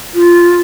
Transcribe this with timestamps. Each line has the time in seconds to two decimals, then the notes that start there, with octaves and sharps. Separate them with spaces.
0.15 F4